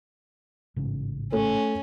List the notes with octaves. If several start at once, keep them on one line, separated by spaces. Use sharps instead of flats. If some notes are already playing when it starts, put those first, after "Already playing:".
A1 G#2 C#3
A3 C#4 A4 C#5